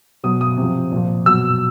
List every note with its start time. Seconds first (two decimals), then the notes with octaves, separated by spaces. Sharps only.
0.24 B2 F#3 D#6
0.41 D#6
0.57 C3 F3
0.92 A#2 F3
1.26 B2 F#3 E6